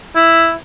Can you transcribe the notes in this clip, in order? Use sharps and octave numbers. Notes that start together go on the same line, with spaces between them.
E4